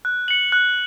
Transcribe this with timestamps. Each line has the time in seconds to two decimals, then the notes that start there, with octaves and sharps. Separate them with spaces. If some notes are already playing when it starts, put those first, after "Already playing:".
0.05 F#6
0.28 C#7 F#7
0.52 F#6